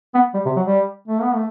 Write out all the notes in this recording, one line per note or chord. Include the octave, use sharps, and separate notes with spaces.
B3
G3
C3
F#3
G3
A3
B3
A3